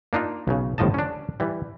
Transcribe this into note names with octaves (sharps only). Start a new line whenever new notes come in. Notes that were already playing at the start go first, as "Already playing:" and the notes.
A#3 D4 D#4 F4
B1 C#3
G1 A2 F3 D#5 A5
C#4 D4
E3 G3